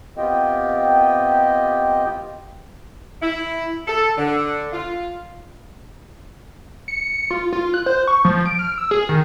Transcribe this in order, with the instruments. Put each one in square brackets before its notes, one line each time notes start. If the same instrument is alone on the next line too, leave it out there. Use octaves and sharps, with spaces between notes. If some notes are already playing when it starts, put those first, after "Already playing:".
[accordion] B3 C4 F4 G4 D#5 G5
[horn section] E4
A4
D3
F4
[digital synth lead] C#7
F4
F4
F#6
C5
C#6
F3
D7
F6
E6
G#4
D#3